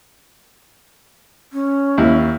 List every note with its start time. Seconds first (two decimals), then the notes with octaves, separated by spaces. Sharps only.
1.53 C#4
1.98 D#2 E4